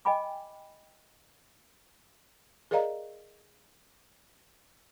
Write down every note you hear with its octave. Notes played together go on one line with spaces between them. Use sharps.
D#5 G5 G#5 B5 D6
G#4 A#4 D5 D#5 F5 A#5